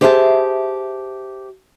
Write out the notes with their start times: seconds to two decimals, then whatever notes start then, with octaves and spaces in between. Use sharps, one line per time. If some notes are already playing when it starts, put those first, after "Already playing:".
0.01 G4 G#4 C5 E5 G#5 A5